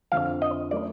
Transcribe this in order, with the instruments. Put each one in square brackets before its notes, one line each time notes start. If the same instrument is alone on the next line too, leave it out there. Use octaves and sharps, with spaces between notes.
[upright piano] F2 D3 F3 [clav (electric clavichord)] F5
[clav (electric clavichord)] D#5
[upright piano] F#3 A3 C#4 F#4 A#4 [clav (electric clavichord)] D5